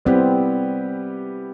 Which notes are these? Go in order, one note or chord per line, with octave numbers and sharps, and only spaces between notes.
G3 B3 C4 E4 G4 B4